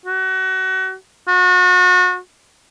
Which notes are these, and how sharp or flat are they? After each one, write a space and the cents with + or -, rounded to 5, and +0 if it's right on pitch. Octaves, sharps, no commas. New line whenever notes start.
F#4 +30
F#4 -35